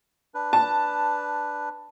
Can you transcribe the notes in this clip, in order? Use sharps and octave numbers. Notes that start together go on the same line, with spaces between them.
D4 B4
A5